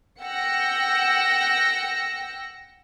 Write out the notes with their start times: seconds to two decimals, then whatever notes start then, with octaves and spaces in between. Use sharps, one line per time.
0.21 F#5 G5 E6 A#6 C#7